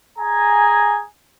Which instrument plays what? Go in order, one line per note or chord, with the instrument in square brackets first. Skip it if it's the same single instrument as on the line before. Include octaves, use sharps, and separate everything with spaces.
[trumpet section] G#4 G#5 A#5